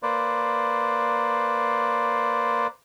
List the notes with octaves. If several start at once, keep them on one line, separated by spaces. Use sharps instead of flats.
A#3 B4 C5 D5